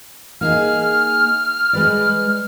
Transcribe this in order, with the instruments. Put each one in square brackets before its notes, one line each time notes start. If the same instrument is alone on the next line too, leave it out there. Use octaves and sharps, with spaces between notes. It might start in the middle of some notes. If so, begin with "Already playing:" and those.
[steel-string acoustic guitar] A#3 D#4 G#4 [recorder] F6
[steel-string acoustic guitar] G#3 B4 D5